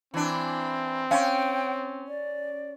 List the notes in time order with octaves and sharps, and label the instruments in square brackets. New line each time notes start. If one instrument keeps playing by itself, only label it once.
[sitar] E3 D4 [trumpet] C4
[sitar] C#4 [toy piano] F5 G#5 C6 [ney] G5
[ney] D5